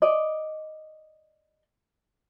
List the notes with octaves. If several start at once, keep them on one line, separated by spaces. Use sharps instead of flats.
D5 D#5